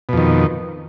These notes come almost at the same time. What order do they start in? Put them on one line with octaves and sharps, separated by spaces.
B2 F2 D#3